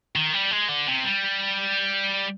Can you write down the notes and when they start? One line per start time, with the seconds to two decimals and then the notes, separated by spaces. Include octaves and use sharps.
0.16 D#3
0.33 G3
0.51 G#3
0.68 D3
0.87 C3
1.05 G3